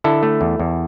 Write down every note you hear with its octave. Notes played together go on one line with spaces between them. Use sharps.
D3 E4 A4
A3
E2
E2